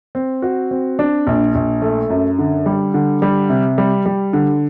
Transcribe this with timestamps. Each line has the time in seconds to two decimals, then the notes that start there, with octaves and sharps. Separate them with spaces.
0.15 C4
0.42 F#4
0.71 C4
0.99 D4
1.27 A#1
1.55 A#1
1.82 A3
2.10 F#2
2.38 D3
2.66 G3
2.94 D3
3.22 G3
3.49 C3
3.78 G3
4.06 G3
4.33 D3